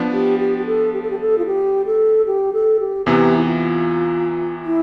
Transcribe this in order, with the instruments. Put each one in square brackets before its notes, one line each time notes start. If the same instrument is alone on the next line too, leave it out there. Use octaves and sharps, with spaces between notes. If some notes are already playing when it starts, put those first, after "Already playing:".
Already playing: [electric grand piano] F3 B3 D4
[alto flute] G4
G4
G4
A4
G4
A4
G4
A4
F4
G4
A4
G4
A4
G4
[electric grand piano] E2 C3 E3 B3 [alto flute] G4
[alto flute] E4
F4
E4